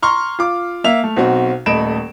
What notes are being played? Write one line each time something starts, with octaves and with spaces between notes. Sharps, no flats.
A#5 C6 C#6 F6
F4 D6
A#3 E5 F7
A3
B1 C4 F#4
D#1 A3 D#5 B5 D7 E7